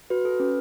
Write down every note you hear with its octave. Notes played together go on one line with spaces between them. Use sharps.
F#4 B4
A4
C#4 B4